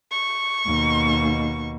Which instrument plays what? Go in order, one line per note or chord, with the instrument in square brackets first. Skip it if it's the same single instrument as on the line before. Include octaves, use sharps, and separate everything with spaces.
[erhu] C#6
[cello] D#2 B2